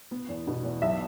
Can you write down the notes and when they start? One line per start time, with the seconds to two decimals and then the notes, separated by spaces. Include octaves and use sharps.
0.11 B3
0.29 E2
0.47 B2
0.64 E2
0.82 B1 E5